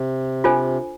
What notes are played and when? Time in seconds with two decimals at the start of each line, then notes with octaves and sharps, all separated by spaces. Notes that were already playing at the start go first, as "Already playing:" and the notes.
Already playing: C3
0.44 D4 F4 A4 C5 G#5